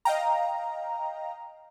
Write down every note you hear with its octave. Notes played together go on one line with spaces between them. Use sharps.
D#5 F5 G5 A#5